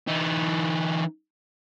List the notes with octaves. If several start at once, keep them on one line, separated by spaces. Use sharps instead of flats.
E3 D#4